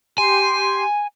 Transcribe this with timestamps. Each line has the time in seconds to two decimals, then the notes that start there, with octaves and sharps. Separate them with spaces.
0.18 G4 G#5 C6